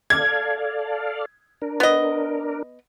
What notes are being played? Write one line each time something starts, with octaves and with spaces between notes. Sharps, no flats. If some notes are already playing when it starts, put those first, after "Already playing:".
A4 D5 F5 G#6
D4 A#4
B3 D#5